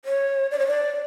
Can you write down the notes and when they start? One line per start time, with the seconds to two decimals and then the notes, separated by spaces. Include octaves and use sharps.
0.05 C#5
0.51 D5
0.59 C#5
0.68 D5